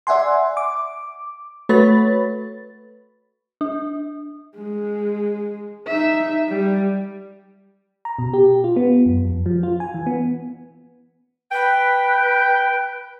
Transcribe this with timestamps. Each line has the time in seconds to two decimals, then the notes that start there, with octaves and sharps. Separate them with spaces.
0.07 D5 E5 F#5 G#5 C6
0.57 D6
1.69 A3 F#4 B4 C#5 B5 A6
3.61 D4
4.56 G#3
5.88 D#4 E5
6.49 G3
8.05 A#5
8.19 B2
8.33 G4
8.64 F4
8.76 B3
9.06 F#2
9.25 F2
9.46 F3
9.63 F4
9.80 G#5
9.94 E3
10.06 B3
11.52 B4 G5